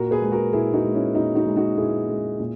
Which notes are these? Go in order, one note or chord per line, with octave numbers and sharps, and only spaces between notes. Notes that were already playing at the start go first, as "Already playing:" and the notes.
Already playing: A#2 F#4 A#4
G#4 B4
G#3 G#4
F#4 A#4
A#2 E4 G#4
D#4 F#4
G#3
C#4 E4
A#2 D#4 F#4
D#4 F#4
G#3
D#4 F#4
A#2 E4 G#4
G#3
A#2